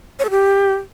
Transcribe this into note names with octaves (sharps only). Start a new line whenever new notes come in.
C#5
A4
G4